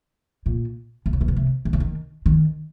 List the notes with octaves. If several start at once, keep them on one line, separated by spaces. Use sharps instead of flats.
A#2
C3
C#3
C3
C#3
C3
D#3
C#3
D#3
D#3